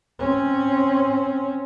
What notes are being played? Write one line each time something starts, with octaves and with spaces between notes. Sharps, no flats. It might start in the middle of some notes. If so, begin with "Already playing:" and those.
C4 C#4